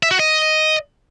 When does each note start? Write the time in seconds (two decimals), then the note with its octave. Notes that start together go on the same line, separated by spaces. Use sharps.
0.03 E5
0.11 F#4
0.19 D#5